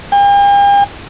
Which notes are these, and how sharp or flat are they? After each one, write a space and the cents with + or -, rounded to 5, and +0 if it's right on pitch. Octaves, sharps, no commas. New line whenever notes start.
G5 +45